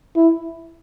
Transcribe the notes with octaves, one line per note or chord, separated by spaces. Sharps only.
E4